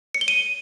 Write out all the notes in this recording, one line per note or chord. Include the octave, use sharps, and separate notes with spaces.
C#7
G7
D#7